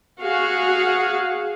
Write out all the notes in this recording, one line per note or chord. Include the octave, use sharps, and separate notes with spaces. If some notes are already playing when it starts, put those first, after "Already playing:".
F#4 G#4 F5